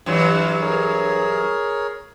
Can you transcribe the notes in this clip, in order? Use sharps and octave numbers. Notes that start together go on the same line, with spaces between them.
G2 E3 F#3 F4
G#4 A#4 C#5